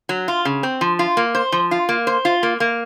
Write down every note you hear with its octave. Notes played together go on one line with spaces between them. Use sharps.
F#3
F4
C#3
C4
F3
F4
A#3
C5
F3
F4
A#3
C5
F4
A#3
A#3